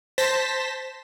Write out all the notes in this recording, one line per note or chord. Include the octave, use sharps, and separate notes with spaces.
C5 A5 A#6 B6 E7